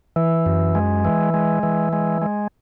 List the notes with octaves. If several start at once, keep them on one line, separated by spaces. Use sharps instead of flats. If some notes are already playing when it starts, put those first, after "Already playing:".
E3
F#2
G#3
E3
G#3
E3
G#3
G#3